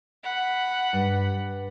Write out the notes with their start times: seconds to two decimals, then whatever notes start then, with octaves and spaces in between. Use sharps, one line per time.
0.24 F#5 B5
0.93 G2